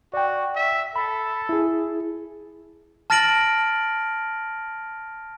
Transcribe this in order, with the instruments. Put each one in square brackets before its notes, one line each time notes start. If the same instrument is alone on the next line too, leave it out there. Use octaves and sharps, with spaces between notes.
[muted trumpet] F#4 [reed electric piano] D5 G5
[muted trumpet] E5
[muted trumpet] A4 [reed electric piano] B5
[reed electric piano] E4 G#4
[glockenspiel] A5 F6 A6 A#6 D7 F#7